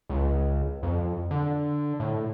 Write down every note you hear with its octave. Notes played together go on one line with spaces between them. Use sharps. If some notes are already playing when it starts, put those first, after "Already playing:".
C#2
F2
D3
A2